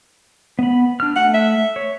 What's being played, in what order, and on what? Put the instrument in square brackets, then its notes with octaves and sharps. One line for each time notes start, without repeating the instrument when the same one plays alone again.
[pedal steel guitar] B3 B5
D4 F6
[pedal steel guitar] A3 [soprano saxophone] F#5
[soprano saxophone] E5
[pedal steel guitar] C#5